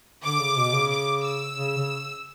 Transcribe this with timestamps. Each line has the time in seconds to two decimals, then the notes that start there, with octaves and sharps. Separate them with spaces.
0.23 D3 D6
0.40 C#3
0.57 B2
0.73 C#3
0.90 D6
1.23 E6
1.56 C#3
1.77 C#3